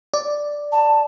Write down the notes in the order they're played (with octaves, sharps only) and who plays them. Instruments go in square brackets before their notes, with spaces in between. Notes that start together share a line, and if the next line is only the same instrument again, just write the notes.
[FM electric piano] D5
[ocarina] A5